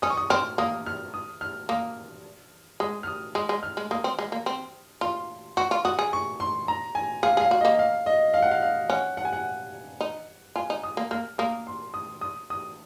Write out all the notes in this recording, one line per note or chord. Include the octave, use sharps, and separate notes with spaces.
C#4 D#6
C#6
D#6
C4 F6
A#3 D#6
F6
D#6
F6
A#3 D#6
G#3 D#6
F6
D#6
G#3 D#6
G#3
F6
G#3
A#3 D#6
C4
G#3
A#3
C4
F4 C6
F#4 C#6
F4
F#4 D#6
G#4
C#6
C6
A#5
G#5
G#4 F5
G#4
F5
F#4
A#3 D#5
F5
D#5
F5
F#5
F5
F5
C#4 F#5
F#5
G#5
F#5
D#4
F4 G#5
D#4
D#6
A#3
A#3 F6
A#3 D#6
C6
D#6
D#6
D#6